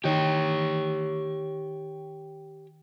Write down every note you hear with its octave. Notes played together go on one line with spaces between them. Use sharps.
D#3 G4 C#5 G5 C7